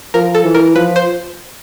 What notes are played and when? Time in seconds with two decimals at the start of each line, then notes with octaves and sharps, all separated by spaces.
0.14 F3 A#4
0.35 A4
0.45 E3
0.54 A#4
0.75 F3 B4
0.96 C5